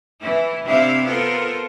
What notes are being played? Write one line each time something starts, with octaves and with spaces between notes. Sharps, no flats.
E3 E4
C3 C4 D4 E4 E5 F5
B3 F4 A4 A#4 C5